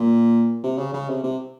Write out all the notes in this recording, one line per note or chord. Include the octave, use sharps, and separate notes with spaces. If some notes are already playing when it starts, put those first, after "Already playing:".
Already playing: A#2
C3
C#3
C#3
C3
C3